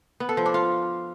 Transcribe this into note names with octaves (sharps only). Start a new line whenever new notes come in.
B3
A4
F3
D4
F4